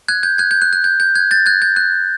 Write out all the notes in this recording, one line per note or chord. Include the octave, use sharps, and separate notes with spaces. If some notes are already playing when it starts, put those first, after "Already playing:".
F#6 G#6
G6
F#6 G#6
G6
F#6
F#6
G6
G6
F#6 G#6
G6 A6
F#6 G#6
G6
F#6